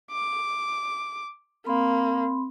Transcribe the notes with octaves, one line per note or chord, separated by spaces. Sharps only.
D6
A#3 C4 B5 C6